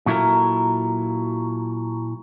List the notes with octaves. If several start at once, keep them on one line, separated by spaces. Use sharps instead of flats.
A#2 F#3 E4 A4 A#4